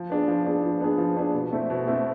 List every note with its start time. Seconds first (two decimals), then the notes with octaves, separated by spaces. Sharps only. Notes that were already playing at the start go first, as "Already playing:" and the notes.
Already playing: F3
0.10 B3 D4 G#4
0.28 F3
0.45 B3 D4 G#4
0.63 F3
0.80 B3 D4 G#4
0.98 F3
1.16 B3 D4 G#4
1.34 B2
1.52 A3 C4 E4 A4
1.70 B2
1.87 A3 C4 E4 A4